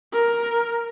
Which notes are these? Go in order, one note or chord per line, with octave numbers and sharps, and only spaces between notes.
A#4